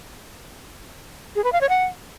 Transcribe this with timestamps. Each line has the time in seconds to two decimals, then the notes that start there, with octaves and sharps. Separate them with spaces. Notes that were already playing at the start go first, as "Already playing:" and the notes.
1.36 G#4
1.44 B4
1.53 F5
1.61 C#5
1.69 F#5